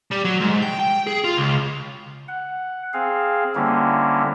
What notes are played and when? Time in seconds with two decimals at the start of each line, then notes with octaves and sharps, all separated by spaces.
0.12 G3
0.25 F#3
0.41 G#2
0.62 G5
0.80 G5
1.07 G#4
1.24 F4
1.37 C#2
2.28 F#5
2.94 C4 G#4 F5
3.55 D3 G3 A#3 C4 C#4 E4